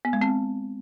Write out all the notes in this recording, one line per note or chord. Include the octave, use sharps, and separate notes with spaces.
B3
G#3
C4